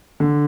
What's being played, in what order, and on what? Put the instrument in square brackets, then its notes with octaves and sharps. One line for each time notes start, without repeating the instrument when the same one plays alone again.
[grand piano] D3